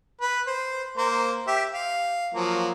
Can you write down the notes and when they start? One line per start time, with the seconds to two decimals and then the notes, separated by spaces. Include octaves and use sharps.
0.21 B4
0.47 C5
0.98 A#3 C5
1.47 G4 E5
1.74 F5
2.34 F3 F#3 A#3